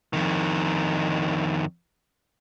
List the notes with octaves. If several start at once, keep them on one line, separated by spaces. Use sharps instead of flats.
F2 D#3